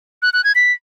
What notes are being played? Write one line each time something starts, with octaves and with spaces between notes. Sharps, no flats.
F#6
F#6
G#6
B6